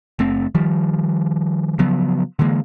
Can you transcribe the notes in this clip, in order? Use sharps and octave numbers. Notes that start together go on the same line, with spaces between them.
F#1 A3 C4
D#3 F3 G3
C#3 F3 F#3 B3
D3 E3 G#3 A#3